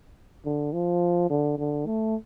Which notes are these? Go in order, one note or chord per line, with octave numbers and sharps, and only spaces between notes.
D3
F3
D3
D3
A3